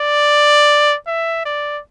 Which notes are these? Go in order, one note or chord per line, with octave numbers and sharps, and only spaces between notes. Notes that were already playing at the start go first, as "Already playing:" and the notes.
Already playing: D5
E5
D5